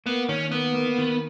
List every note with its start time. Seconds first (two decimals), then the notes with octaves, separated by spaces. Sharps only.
0.06 A#3 B3
0.29 D#3 C#4
0.51 A#3 B3
0.74 A#3
0.98 D#3